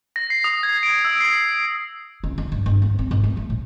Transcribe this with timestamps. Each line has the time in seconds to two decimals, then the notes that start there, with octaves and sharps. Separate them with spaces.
0.16 A#6
0.30 C7
0.44 D#6
0.63 G#6
0.83 D7
1.05 E6
1.20 C7
2.24 C#3
2.38 D3
2.52 G2
2.66 G1
2.82 G2
2.99 C4
3.11 G#1
3.24 A3
3.37 A3
3.50 A2